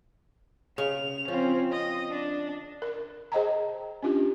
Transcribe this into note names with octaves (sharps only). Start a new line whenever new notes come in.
C#3 F7
F3 C4 C#4
D#5
D4
A#4
G#4 C5 D#5 G5 A5 A#5
C#4 D4 F4 G4